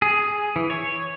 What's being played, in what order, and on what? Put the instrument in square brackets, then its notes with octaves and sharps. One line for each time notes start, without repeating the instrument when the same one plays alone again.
[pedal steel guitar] G#4
E3
C#5